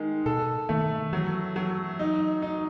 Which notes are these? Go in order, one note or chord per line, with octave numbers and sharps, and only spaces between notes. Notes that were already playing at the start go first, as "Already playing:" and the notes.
Already playing: D#3 G#3
B2 A4
D#3 A3
E3 F#3
F#3
D#4
D#4